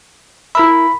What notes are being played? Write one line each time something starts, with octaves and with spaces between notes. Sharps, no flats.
E4 A#4 E5 B5